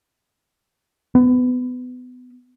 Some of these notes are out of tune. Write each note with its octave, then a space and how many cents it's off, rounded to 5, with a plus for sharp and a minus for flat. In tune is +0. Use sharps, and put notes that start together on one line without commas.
B3 +25